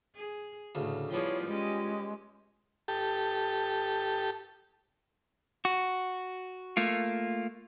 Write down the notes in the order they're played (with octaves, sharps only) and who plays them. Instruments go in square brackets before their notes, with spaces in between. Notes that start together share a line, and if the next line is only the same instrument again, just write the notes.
[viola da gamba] G#4
[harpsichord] D2 C#3 [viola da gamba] A2
[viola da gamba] F3 E4 G#4 [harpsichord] G3 B3 G5 [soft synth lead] F4 [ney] C#5
[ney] G#3 [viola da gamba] C#4 G4 D#5
[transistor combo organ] G4 A4
[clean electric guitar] F#4
A3 A#3 F4